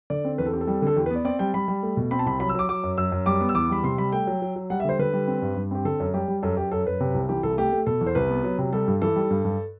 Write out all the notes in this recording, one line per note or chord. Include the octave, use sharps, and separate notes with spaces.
D3 D5
C4
E2 B4
A4
C4 G4
A4
G3
D3 A4
E2 G4
B4
B3 D5
C4 D5
G3 G5
G3 B5
G3
A3
B2
C4 B5
A5
C2 B5
F#3 B5
E6
F#3 D6
F#3 D6
F#2
F#2 E6
F#2
G3 D6
B3
E6
E2 D6
G3 B5
C3 C6
G3 B5
A3 G5
F#3
F#3
F#3
G3 F#5
E5
D3 C5
D3 B4
G3
C4
G2
G2
C4 G4
D3 A4
F#2
G3 G4
G3
F#2 A4
F#2 G4
F#2 A4
F#2 B4
C3
C2
E3 G4
C2 A4
A3 G4
A3
B2 A4
E2
C5
C2 B4
B3
F#3
C3
G3 A4
G2
E3 A4
G3
G2
G2